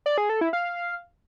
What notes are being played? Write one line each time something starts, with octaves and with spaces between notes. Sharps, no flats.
D5
G#4
A4
E4
F5